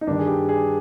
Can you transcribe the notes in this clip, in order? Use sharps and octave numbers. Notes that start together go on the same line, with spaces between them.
D#4
G2 D#3 G3 D4
G#4
G4
G#4